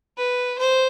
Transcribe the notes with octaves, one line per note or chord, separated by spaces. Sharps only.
B4
C5